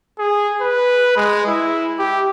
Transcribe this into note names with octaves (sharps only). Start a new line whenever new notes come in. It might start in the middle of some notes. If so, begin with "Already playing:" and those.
G#4
B4
G#3
E4
G4